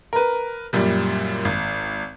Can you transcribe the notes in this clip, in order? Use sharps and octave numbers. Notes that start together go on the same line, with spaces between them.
A#4 B4
F#2 A#2 G3
G#1